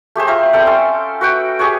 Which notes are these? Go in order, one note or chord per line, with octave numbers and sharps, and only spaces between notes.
A3 G4 G#4 C5
F4 C5 E5 A#5
G3 C4 A4 G5
C#4 A4 C6
F#4 B4 F#5 G5
G4 G#4 B4 C#5